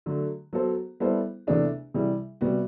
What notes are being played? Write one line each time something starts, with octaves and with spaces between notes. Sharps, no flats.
D3 F#3 A3
F#3 B3 F#4 A4 C5
G3 B3 E4 A4 C5
E2 C3 E3 A3 D4
C3 E3 G3
C3 G3 B3 F#4